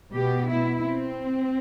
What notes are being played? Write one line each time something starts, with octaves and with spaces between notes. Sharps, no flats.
B2 B3 G4
E4
C4